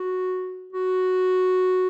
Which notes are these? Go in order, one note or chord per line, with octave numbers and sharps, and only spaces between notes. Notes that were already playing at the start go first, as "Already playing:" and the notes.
Already playing: F#4
F#4